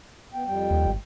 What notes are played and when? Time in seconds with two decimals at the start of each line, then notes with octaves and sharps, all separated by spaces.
0.33 B3 G5
0.46 F2 G3 G5
0.71 D#2
0.86 G#1